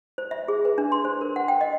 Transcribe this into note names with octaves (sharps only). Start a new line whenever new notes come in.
C5
E5
G#4
B4
D4
C6
C5
A#4
F#5
G5
D#5